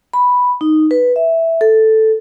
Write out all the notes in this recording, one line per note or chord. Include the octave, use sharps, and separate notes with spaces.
B5
D#4
B4
E5
A4